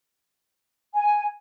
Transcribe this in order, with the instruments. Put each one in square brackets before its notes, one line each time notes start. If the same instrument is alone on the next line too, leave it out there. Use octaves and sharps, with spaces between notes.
[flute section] G#5